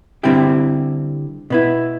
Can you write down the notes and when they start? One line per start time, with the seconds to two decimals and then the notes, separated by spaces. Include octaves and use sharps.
0.23 D3 G3 C4 E4 G4
1.50 B2 B3 E4